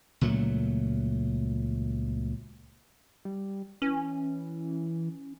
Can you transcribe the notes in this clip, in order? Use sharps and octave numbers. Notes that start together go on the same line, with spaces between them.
C#2 A#2 F#3 A3
G3
E3 C#4